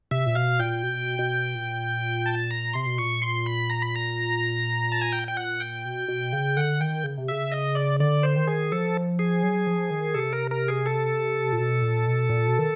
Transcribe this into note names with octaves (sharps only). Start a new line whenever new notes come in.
C3 E5
A#2
B2 F5
A#2 G5
B2
B2
A#2
A5
A#5
C3 C6
B2
A#2 C#6
C6
B5
A#5
B5
A#5
A5
G#5
G5
G5
F#5
G5
B2
B2
C#3
D3 F#5
D#3 G5
C#3
C3
C#3 E5
D#5
D5
D3 D5
C5
D#3
G#4
F3 A4
G#4
F#3
F3
D#3
C3 A4
A#4
A#4
G#4
A4
A#2
B2
A#2
B2
A#2
B2
D#3